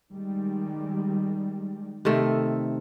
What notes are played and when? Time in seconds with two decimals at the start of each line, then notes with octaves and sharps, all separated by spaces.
0.12 D#3 G3 G#3
2.05 C3 D#3 A3